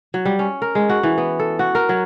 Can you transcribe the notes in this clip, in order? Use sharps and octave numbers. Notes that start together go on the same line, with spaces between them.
F#3
G3
C#4
A#4
G#3
F#4
E3
B3
A4
F#4
A#4
F#3